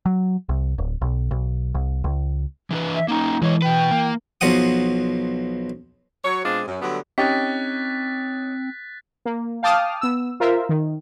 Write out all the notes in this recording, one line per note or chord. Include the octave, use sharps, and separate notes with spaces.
F#3
C2
D1
B1
B1
C2
C#2
E3 D4 B4
E5
A#3 C#4 D#4
E3 G#3 E4 C#5 D#5
B2 B4 G5
A#3
B1 B2 F3 F#5 D#6
F#3 C#5
B2 G#3 C4 D4 F4
F#2
D3 F#3 G3 A3 B3
C4 C#4 D#4 G4 F#6 A6 B6
A#3
F5 G5 A5 D6 D#6 F6
B3 E6
F4 A#4 C5 E5
D#3